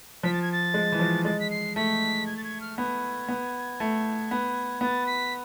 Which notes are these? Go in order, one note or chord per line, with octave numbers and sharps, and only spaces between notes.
F3 B6
A6
G#6
A6
G#3
E3
F3
G#3 A6
B6
C7
A3 B6
G#6
A6
G#6
F6
B3 G#6
B3
A3
B3
B3 A6
B6